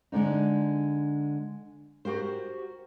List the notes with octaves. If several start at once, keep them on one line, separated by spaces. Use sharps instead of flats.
D3 G#3 D4 D#4
F#4 G4 A#4 C5